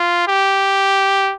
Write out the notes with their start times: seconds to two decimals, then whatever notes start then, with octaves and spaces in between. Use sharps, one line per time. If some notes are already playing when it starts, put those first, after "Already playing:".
Already playing: F4
0.28 G4